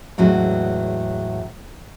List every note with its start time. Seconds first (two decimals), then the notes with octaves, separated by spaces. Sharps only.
0.18 E2 A2 F#3 G#3 C#4